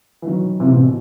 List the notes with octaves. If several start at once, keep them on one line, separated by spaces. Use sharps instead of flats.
E3
D#3 F#3
C3 E3
A2 C3
B2